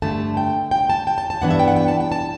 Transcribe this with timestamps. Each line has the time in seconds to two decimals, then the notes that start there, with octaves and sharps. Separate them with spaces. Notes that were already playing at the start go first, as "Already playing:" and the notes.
0.02 G2 D3 A3 A5
0.37 G5
0.71 G5
0.90 A5
1.07 G5
1.18 A5
1.30 A5
1.41 G2 E3 B3 D4 F#5
1.50 E5
1.59 G5
1.68 F#5
1.76 G5
1.88 A5
2.00 G5
2.12 A5